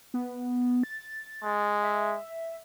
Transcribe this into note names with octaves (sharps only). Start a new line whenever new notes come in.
B3
A6
G#3
E5